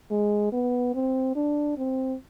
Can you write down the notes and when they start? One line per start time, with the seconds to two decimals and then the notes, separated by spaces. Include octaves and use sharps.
0.11 G#3
0.52 B3
0.94 C4
1.35 D4
1.77 C4